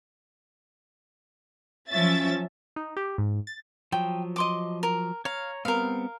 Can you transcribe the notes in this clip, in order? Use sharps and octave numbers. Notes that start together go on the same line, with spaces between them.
F3 F#3 C#4 E5 A6
D#4
G4
G#2
A6
F3 F#3 G5
D#5 C6 D6
A#4
C#5 F5 A#5
G3 B3 C4 A#4 F5